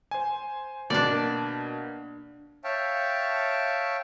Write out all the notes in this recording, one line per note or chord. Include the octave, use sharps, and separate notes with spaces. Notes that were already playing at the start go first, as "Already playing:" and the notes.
C5 G#5
B2 A#3 D4 D5
C#5 E5 F5 G5 A5